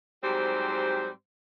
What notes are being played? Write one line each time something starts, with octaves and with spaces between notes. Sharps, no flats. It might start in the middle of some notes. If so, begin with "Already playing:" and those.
G#2 F#3 G3 C4 G4 C5